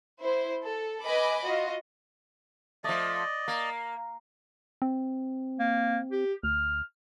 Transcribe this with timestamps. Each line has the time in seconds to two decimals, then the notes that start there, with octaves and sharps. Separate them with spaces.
0.21 E4 C5
0.63 A4
1.04 B4 D#5 G#5 B5 D6
1.44 F4 F#4 D#5
2.84 F3 A3 D5 D#5
3.48 A#3
4.82 C4
5.59 A#3
6.11 G4
6.43 D2 F6